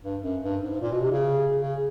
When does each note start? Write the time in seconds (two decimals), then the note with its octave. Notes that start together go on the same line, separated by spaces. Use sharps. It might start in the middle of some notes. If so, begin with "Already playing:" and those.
0.03 G2
0.22 F#2
0.43 G2
0.63 G#2
0.82 A#2
0.92 B2
1.01 C3
1.12 C#3
1.61 C#3